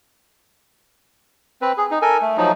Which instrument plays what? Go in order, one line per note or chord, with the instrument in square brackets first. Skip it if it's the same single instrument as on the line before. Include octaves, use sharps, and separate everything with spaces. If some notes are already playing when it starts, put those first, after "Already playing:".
[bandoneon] C4 B4
G#4
D#4
A4 A#4 G#5
A3
F3 F#3 D#4